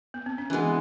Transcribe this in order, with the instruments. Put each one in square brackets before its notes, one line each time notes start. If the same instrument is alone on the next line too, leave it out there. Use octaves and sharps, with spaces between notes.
[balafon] B3
C4
C#4
[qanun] E3 G#3 B3 [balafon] D4